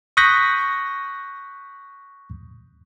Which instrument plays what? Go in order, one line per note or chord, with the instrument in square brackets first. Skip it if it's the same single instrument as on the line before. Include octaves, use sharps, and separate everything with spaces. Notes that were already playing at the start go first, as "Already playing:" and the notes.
[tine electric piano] C#6 D#6 F#6 G6 A#6 B6